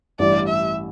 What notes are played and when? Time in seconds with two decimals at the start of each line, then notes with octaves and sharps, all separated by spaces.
0.19 A1 G2 G3 E4 D5
0.48 E5